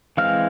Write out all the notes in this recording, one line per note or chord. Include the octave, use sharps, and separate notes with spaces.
E3 G#3 C4 F5 F6